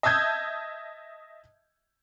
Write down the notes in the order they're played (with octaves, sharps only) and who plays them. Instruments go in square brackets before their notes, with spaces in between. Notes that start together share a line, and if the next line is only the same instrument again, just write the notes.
[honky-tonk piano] D#5 E5 A5 D#6 G6 G#6